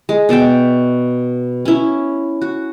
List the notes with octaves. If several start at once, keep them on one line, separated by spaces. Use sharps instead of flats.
G#3
B2 D5 E5 G5
C#4 E4
F#4